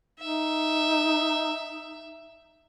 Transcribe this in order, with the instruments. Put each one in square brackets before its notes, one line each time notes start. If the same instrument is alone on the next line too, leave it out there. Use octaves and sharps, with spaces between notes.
[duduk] D#4 [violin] E5